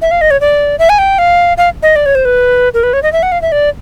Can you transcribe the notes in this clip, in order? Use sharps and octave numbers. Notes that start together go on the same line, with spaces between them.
E5
F5
D#5
C#5
D5
E5
G#5
G5
F5
F5
D#5
D5
C#5
C5
B4
A#4
B4
C#5
D#5
E5
F#5
F5
E5
D5